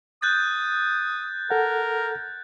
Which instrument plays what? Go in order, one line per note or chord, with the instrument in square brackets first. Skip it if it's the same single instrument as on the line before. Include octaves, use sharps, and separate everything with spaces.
[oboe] D#6 [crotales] F#6 G6 A6
[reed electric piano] A4 F#5 [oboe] A#4